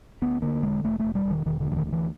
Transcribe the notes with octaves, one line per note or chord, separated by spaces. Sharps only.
D2 B3
D3 A#3
E1 G#3
E1 A3
E1 A3
G3
E1
D#3
E1 D#3
D3
D2
E3
D#3
D3
E3